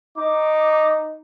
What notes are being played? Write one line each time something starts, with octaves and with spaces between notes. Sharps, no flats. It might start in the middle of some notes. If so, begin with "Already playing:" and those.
D#4 D6